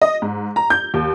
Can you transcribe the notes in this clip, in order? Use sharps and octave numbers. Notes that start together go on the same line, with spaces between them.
D#5
G#2
A#5
G6
D#2